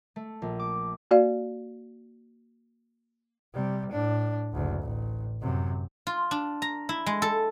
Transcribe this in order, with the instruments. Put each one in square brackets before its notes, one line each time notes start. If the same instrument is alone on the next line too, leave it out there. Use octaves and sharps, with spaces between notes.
[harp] A3
A#1
D6
[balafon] A#3 F#4 D5 F5
[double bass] C3 G3
A2 D4
F#1 D2
A1
F#2 C3
[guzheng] F4
D4
A#5
E4
G#3
A4